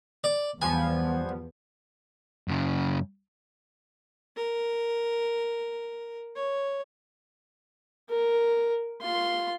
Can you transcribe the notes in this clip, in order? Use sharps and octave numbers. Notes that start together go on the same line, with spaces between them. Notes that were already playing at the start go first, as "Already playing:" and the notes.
D5
E2 F3 G3 B3 G#5
F#2 C#3
A#4
C#5
A#4
F4 C6